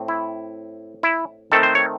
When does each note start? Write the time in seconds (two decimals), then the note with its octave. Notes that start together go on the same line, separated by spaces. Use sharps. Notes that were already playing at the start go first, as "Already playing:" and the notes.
Already playing: A2 C4
0.08 E4
1.03 E4
1.52 D#3 A3 C4 A4
1.63 C5
1.75 C#5